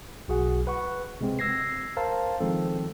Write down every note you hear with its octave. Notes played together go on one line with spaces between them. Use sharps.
B1 F#4 G#4 F#5
B4 F#5 C#6
C3 G#3 C4
E6 G#6 A#6 C7
A#4 C5 F5 A5
D#3 F3 G#3 C4 A4